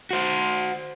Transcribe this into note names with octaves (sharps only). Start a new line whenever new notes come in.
F#4 C5